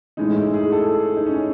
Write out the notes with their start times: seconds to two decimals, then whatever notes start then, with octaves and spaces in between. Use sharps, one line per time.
0.17 A2 E3 G#3 D#4
0.36 E4
0.54 G#4
0.72 A4
1.16 D#4
1.26 C#4